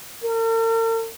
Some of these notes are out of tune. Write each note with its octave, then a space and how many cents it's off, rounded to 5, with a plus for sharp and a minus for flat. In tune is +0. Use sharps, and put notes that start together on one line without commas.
A#4 -45